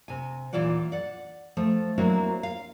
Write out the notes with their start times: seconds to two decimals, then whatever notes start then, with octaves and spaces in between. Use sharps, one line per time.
0.08 C3 G#5
0.53 D#2 A#2 E3 F4 D5 F#5
0.92 D5 F#5
1.57 F3 A3
1.98 F#3 A#3 C4 D4 E4 F#4
2.43 F5